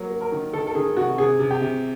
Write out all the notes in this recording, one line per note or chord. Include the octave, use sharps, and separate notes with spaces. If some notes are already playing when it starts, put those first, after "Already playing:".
Already playing: F#3 A#3
A#3
A#4
D#3
D#3 A4
A4
D#3 G#4
C3 F#4
C3 G#4
C3
G4
C3